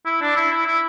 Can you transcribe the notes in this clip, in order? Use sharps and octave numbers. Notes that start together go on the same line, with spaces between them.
E4
D4
E4
E4
E4